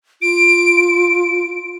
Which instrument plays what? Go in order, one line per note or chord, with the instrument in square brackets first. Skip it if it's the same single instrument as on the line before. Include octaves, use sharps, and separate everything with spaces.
[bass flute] F4 [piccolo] D7